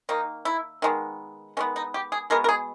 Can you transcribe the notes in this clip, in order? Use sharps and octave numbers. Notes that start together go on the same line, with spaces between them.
D#3 A#3 D#4
E4
D#3 G#3 B3
D#3 G#3 B3 C#4
D#4
G4
G#4
B2 G#3 B3 A#4
A#4
G#4